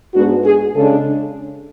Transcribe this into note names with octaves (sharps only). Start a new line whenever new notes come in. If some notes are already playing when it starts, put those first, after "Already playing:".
G#2 G#3 B3 D4 F#4
G#4
C#3 G#3 D4 A4